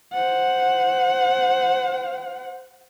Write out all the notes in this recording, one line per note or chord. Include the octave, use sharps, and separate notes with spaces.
C5 F#5